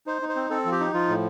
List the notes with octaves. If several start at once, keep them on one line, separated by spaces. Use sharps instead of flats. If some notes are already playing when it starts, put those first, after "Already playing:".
D#4 C5
D#4
C5
C4
C4 A4
F3
G4
D#4
F3 F4
A2